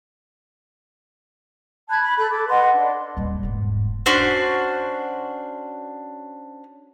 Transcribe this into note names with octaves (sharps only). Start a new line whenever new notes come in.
A5 B5 F#6 G#6
B5
A4 B5 F#6
A4 D6
B4 D#5 F#5 C6
D4
D#1 G3
E1 G#2
C#4 D4 F#4 C5